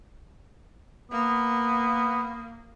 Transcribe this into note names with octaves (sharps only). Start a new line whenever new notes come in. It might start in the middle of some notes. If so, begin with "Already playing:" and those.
A#3 B3